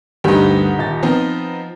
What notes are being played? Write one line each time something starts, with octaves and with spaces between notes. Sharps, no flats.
D2 G2 D3 D#4 G4
D#1 A6
F3 B3 C4 D#4